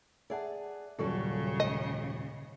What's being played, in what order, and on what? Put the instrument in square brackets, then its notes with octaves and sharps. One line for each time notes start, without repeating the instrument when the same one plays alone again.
[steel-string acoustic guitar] G#4 D5 [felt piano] E5 F#5 A5
[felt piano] D#1 F#2 C#6 [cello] C#3 [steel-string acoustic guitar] G3 F#4 A4
[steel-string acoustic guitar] G#2 [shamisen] D#5